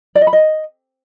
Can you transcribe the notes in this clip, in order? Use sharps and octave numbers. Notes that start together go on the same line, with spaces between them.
D5
D#5
B5
D#5